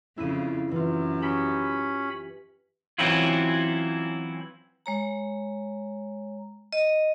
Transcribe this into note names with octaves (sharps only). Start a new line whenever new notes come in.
F2 C#3 E4 B6 D#7
F#2 E3 F4
C#4 G4 B5 E7
E3 F#3 C4 C#4 E4 F4
G#3 C#5 A#5
D#5